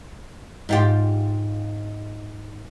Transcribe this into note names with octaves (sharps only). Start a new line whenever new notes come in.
G#2 F4 G4